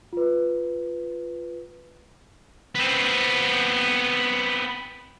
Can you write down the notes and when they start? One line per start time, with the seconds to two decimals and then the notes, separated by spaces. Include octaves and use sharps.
0.13 F4 B4
2.75 B3 C4